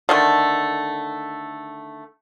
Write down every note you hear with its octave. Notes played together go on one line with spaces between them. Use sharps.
D3 D#3 A3